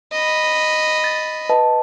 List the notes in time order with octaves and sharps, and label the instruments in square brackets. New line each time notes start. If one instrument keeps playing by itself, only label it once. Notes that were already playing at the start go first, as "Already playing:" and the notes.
[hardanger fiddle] D#5 B5
[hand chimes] A6
B4 D#5 A5